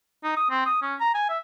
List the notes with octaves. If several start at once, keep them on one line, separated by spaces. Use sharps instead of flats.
D#4
D#6
C4
D#6
C#4
A#5
G#5
E5